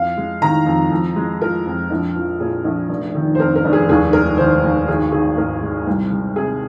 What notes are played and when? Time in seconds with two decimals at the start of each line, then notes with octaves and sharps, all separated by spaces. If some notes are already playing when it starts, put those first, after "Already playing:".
Already playing: F2 F5
0.17 G#3
0.42 D#3 A#5
0.66 F2
0.91 F2
1.16 G#3
1.41 F3 A#4
1.66 F2
1.90 A#1
2.15 F3
2.40 A#2 G#4
2.65 A#1
2.89 F1
3.15 D#3
3.35 C5
3.39 F2 A#4
3.56 A#4
3.65 F1
3.73 G#4
3.89 D#2 G#4
4.13 G#3 A#4
4.38 D#3 C5
4.63 D#2
4.87 G#1 G#4
5.12 D#3 G#4
5.37 G#2 A#4
5.62 G#3
5.87 C2
6.12 G#3
6.36 C3 G#4